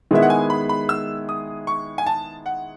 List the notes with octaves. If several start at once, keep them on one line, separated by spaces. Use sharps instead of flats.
D#3 G#3 B3 E4 G#4 E5
F#5
G#5
B5
B5
E6
D#6
C#6
G#5
A5
F#5